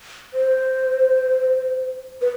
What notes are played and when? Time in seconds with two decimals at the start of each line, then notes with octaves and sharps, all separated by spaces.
0.34 C5
2.21 B4